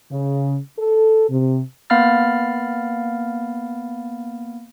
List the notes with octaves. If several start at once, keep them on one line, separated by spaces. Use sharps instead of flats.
C#3
A4
C3
A#3 B3 F5 B5 F6 A6